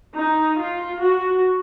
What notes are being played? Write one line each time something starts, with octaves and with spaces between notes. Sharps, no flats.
D#4
F4
F#4